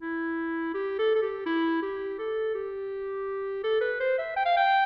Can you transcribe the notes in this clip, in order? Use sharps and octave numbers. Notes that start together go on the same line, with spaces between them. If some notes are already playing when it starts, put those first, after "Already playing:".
E4
G4
A4
A4
G4
E4
G4
A4
G4
A4
B4
C5
E5
G5
F5
G5